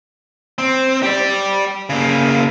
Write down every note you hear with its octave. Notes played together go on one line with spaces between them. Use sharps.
C4
G4 D5
C#3 A#3